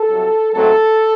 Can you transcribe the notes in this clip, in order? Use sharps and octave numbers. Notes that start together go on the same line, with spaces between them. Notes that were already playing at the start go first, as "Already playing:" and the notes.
Already playing: A4
C2 C3 F#3
G#2 F#3 A3 C4 A4